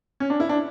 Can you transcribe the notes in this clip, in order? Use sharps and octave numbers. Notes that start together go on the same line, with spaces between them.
C#4
D4
E4
D4